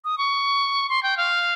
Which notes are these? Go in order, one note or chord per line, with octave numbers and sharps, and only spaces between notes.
D#6
C#6
C6
G5
F5